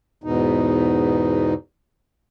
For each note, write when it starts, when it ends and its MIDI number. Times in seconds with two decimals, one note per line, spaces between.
0.24 1.54 40
0.24 1.54 44
0.24 1.54 47
0.24 1.54 63